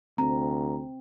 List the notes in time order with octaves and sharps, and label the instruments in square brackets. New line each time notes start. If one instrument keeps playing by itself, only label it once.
[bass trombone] D2 [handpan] C4 [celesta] A#5